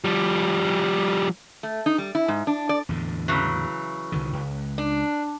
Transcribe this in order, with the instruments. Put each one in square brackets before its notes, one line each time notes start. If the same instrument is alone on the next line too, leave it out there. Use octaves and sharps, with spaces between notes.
[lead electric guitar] F3 G3
[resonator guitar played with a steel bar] A3
D#4
G3
E4
G#2
D4
D5
[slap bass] E2 A2 D3
[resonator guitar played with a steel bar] C#3 E3 F#3
[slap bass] C2 D3 D#3
C#2
[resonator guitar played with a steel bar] D4